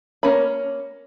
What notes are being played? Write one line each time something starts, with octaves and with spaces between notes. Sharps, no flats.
A#3 C#4 B5